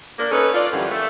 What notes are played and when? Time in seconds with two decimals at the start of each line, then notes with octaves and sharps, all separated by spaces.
0.18 A#3 D4 A#4
0.31 C#4 D#4 A4 B4
0.54 F4 D5
0.72 F#2 D3 E3 G3
0.91 A3